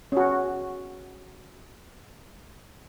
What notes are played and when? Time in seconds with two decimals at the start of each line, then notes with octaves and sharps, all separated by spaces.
0.12 C#4 F#4